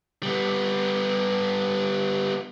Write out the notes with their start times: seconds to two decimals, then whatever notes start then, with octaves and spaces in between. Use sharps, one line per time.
0.23 G3 B3